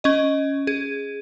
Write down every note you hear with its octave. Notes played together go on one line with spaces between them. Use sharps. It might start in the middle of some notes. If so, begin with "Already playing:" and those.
C#4 D#5
G#4